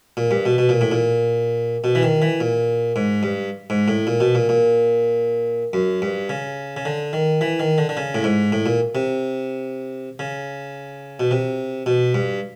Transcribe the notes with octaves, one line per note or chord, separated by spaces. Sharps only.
A#2
G2
B2
B2
A#2
A2
A#2
B2
E3
D#3
E3
A#2
G#2
G2
G#2
A2
A#2
B2
A#2
A#2
F#2
G2
C#3
C#3
D3
D#3
E3
D#3
D3
D3
C#3
A2
G#2
A2
A#2
C3
C#3
B2
C3
B2
G2